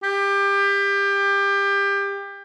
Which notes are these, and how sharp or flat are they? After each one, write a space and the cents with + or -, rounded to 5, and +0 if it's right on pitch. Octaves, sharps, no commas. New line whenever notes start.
G4 +25